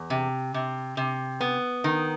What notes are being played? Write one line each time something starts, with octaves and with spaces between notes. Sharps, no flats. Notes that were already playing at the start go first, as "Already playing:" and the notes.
Already playing: E2
C3
C3
C3
B3
D#3